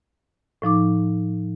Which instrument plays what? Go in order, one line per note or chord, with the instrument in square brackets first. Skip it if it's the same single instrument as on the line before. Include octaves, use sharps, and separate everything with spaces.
[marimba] A2 F3 D#4 D6